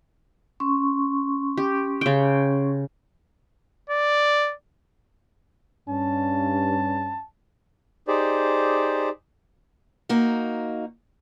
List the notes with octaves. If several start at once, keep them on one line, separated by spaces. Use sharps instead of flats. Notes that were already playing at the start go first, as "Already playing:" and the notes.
C#4 C6 C#6
G4
C#3 G5
D5
G2 C#4 A5
D#4 G4 G#4 C5 D5
A#3 D#4 F#4